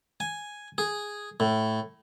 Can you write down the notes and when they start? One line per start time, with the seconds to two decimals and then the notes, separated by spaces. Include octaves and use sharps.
0.20 G#5
0.78 G#4
1.40 A2